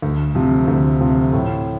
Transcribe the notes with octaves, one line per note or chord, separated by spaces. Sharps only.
D2
C3 F3
D2
C3 F3
A2